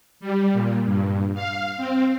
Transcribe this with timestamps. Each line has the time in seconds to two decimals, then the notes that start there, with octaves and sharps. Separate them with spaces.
0.20 G3
0.53 A#2
0.85 G2
1.34 F5
1.77 C4